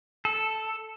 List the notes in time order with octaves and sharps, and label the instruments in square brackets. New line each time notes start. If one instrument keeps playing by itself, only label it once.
[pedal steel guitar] A4